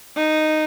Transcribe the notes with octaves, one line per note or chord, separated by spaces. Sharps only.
D#4